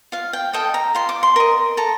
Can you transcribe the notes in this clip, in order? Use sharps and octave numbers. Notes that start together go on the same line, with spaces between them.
F4 F5
G5
A4 D#5 G5
A#5
F4 C6
D6
C6
A#4 D#5
A4 A#5